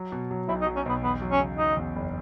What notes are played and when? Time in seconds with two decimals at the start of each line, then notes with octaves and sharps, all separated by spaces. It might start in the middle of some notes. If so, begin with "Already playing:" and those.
Already playing: F#3
0.12 B2
0.31 F#3
0.48 B1 E4
0.62 D#4
0.66 F#3
0.76 C#4
0.86 B1 B3
1.03 E2 B3
1.22 F#3
1.32 C#4
1.39 C#3
1.58 F#3 D#4
1.77 E2
1.95 F#1